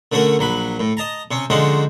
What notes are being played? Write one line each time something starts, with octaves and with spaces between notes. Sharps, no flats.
D3 A3 C#4 F#4 A#4
A#1 F#3 B5
A2
D#5 A5 A#5
C3 C#4
D3 F3 G#3 C#4 D#4 F#4